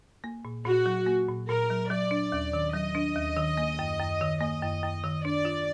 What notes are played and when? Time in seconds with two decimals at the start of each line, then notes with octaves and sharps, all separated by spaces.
0.24 A#3
0.45 A#2
0.65 A#2 F#4
0.86 F#3
1.07 A#3
1.29 A#2
1.49 A#2 A#4
1.70 F#3
1.90 F#3 D5
2.11 D4
2.32 D#2
2.53 D#3
2.74 F#3 D#5
2.95 D4
3.16 D#2
3.37 D#3
3.57 A#3
3.79 F#2
4.00 F#2
4.21 D#3
4.40 A#3 D#5
4.63 F#2
4.83 F#2
5.04 D#3
5.25 D4 D5
5.45 F4